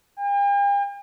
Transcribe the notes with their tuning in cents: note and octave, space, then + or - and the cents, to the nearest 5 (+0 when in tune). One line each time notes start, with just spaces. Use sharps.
G5 +45